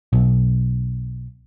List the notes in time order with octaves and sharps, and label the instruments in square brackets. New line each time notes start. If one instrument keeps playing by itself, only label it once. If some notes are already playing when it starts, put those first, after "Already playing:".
[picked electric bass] B1